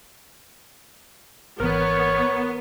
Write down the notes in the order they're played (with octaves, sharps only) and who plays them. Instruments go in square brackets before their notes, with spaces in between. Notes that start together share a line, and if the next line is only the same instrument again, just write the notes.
[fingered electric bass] G#1 E3 [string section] B3 [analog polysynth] A#4 [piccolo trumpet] C#5